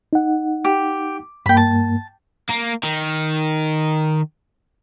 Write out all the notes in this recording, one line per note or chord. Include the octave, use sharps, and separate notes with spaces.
D#4 F#5
G4
G2 A#3 G5 B5
A5
A#3
D#3